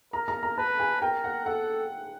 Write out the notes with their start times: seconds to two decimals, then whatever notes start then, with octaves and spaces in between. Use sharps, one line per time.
0.13 A#4 A#5
0.28 A#5
0.43 A#5
0.58 B4 A5
0.80 G#5
1.01 A#4 G5
1.24 F#5
1.45 A4 F#5